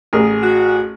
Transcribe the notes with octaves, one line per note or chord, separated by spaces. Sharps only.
A1 G#4 A#4
F#4